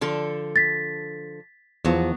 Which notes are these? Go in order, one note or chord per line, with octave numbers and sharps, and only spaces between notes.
D3 F3 A4
A6 B6
E2 F3 F#3 B3